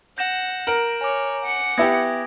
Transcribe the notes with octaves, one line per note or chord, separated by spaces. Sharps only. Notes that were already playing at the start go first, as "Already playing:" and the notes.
F#5 G6 A#6 E7
A#4 D7 F#7
C#5 G#5 D6
F#5 C#7
B3 E4 G4 D#6 G#6 A#6